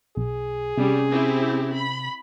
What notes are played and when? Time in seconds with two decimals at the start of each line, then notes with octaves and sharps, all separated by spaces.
0.17 B1 G#4
0.77 C3 G3 C#4
1.10 C4 E4 G4
1.74 B5